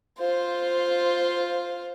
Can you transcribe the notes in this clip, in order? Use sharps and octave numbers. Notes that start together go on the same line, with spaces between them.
F4 C5